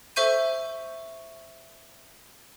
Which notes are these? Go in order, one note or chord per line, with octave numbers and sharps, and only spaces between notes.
A4 C5 E5 C#6 G6 D#7